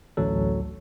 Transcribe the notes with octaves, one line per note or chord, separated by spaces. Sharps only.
A1 D2 F#3 A4